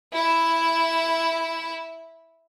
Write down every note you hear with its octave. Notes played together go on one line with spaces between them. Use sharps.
E4 E5